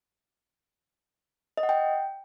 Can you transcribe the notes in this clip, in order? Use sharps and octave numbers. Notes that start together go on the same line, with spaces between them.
D#5
F#5
G5